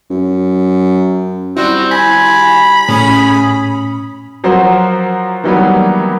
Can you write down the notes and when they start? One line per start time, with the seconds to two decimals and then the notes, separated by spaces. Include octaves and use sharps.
0.10 F#2
1.57 G3 C4 E4 F#4
1.91 G#5 B5
2.89 A2 C#4 G#4
4.44 F3 F#3 F#4 A#4 C5
5.44 D#3 E3 F#3 G3 A#3 B3